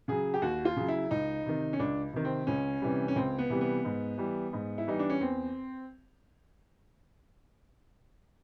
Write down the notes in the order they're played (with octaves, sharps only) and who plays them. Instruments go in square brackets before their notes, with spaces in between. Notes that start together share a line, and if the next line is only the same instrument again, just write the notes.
[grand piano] C#3 F#3 G#4
G4
D#2 F#4
F4
C#3 F#3
E4
C#2 D#4
C3 D#3
C#4
C#2 D4
C3 D#3
C4
C#2 C#4
C3 E3 G3
C#4
C#2 C4
B3
C3 E3 G3
B3
G#2
E3 G3
G#2
E4
E3 G3 D#4
D4
C#4
E2 C4